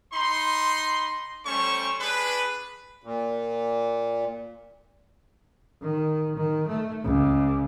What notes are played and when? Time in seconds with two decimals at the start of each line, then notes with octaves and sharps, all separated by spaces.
0.13 D#4 B5 C6
1.45 G3 A3 C#4 C5 C#6
1.99 D4 G#4 B4
3.03 A#2
5.81 D#3
6.36 D#3
6.68 A3
7.04 C#2